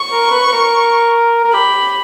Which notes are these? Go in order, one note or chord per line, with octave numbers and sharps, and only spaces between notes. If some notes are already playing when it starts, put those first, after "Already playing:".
Already playing: C#6
A#4
B4
B4
A#4
A#4
G4 B5